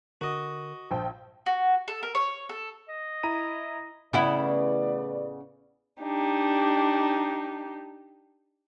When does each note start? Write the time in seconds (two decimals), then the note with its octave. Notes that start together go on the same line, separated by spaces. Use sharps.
0.21 D3 F#4 A#4 D#5
0.91 A#1 C5 G5 A5
1.46 F#4
1.88 A4
2.03 A#4
2.15 C#5
2.49 A4
2.89 D#5
3.23 E4 A#5 D#7
4.13 A1 C#3 B3 E4 B4 D5
6.02 D4 D#4 G4